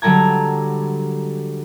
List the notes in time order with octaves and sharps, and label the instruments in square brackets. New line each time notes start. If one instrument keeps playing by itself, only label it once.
[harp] D3 F#3 G3 A4 A#5 G#6